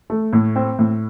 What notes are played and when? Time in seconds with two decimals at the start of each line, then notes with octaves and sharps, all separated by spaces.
0.10 A3
0.33 A2
0.56 C4
0.79 A2